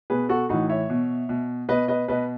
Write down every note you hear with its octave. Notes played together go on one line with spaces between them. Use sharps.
B2 G#4 B4
F#4 A4
A2 E3 D#4 F#4
C#5 E5
B2
B2
B2 B4 D#5
B4 D#5
B2 B4 D#5